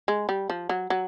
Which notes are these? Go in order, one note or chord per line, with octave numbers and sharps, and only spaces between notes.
G#3
G3
F3
F#3
F#3